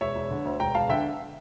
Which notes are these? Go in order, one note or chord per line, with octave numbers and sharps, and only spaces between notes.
E1 C#5 E5
E1
D3
D2
E1 G5 A#5
E1 F5 A5
D3 E5 G5